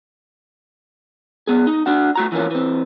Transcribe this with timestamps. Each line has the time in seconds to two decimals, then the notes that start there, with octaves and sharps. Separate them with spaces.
1.47 B1 A#2 B3 G#4
1.67 D#4
1.86 D4 F#4 F#5
2.16 A3 F#4 A#5
2.32 E3 F3 A#3 C#4
2.51 E3 C4